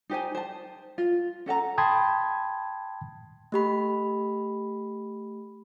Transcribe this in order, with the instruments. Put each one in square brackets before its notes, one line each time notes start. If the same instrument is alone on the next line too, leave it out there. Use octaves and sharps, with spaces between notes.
[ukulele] D#4 G4 C5 G#5
C5 A5
F4
C#4 A4 F#5 A#5
[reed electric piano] G5 A5 B5 C6 D#6 G#6
[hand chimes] A3 G4 B5